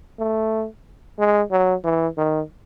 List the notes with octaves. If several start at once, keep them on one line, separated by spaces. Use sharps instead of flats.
A3
G#3
F#3
E3
D#3